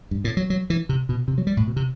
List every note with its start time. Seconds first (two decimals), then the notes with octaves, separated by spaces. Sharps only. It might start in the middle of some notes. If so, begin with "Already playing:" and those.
0.11 G2
0.24 A2
0.37 F#3
0.50 F#3
0.70 E3
0.89 C3
1.09 B2
1.28 C3
1.38 F#3
1.47 G3
1.57 A2
1.67 B2
1.76 C3